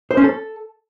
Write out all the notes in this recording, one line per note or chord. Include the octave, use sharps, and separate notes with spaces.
C5
C#4
A4